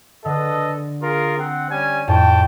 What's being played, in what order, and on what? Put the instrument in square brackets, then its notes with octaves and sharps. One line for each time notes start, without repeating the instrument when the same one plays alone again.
[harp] D3 [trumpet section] A4 B4 D#5
[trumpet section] F4 G#4 A#4
C4 F#5
G3 C#4 G#5
[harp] F2 A2 [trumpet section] G5 A5